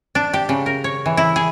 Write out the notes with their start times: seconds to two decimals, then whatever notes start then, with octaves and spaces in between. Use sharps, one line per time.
0.15 D4
0.34 G4
0.49 C#3
0.66 A#4
0.84 C#5
1.06 E3
1.17 E4
1.36 G#4